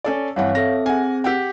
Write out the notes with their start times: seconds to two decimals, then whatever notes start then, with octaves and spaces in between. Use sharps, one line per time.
0.04 C#4 A4 D5
0.36 G2 E3 C4 C#5 F5 F#5
0.55 C4 A4 E5 A#6
0.86 C4 G#4 F#5 G#5
1.24 G4 F#5 G5